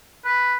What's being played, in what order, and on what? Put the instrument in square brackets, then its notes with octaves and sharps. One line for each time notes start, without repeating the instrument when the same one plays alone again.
[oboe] B4